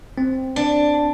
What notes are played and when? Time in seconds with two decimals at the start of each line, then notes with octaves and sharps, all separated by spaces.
0.18 C4
0.56 D4